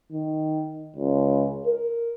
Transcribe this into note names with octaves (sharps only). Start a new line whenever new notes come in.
D#3
C#2
A#4